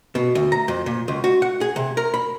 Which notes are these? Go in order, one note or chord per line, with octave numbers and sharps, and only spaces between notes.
B2
D2
A#5
F2
A#2
C#2
F#4
F#5
G#4
C3
A#4
B5